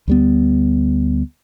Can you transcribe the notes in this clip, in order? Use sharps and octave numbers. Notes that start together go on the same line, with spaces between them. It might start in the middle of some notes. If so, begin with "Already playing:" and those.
D2 G3 B3